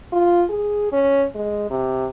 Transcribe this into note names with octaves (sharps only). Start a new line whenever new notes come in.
F4
G#4
C#4
G#3
C3